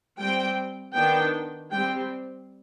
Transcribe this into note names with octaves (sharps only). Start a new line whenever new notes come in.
G3 C4 G5
D#3 B3 D4 G5
G3 C4 G5